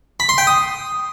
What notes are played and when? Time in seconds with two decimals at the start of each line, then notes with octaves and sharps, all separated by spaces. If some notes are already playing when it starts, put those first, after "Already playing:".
0.20 B5
0.29 C6
0.38 G5
0.47 D#6